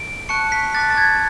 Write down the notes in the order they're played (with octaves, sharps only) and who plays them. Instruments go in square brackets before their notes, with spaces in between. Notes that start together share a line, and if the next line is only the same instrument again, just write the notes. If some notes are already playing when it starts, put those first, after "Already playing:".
Already playing: [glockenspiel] D7
A5 C#6 F#6 C#7
B6
A5 D6 F#6 A6
A6
G#6